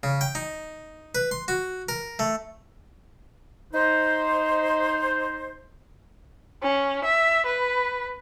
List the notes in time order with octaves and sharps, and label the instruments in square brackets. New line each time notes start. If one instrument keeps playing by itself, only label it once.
[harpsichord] C#3
G5
D#4
B4
C6
F#4
A#4
A3
[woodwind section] D#4 C5
[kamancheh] C#4
E5
B4